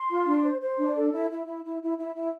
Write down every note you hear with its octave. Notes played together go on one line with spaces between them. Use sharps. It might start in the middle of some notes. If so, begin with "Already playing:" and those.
Already playing: C6
F4
D4
C5
C5
D4
A4
E4
E4
E4
E4
E4
E4
E4